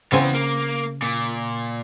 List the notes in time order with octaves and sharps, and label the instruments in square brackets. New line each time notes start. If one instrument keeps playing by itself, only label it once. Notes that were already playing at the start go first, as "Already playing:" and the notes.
[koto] C#3 C4 G#5 [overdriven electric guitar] E3 B3
[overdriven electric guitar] A#3
A#2